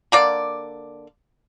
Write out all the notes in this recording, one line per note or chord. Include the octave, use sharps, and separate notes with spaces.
D3 A#3 D5